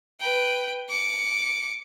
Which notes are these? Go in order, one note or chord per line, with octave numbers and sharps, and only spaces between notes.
B4 G5
D6 C#7